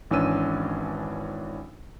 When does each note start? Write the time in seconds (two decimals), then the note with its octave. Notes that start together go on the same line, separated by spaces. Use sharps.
0.11 G#1 E3 C#4 D4 E6 D#7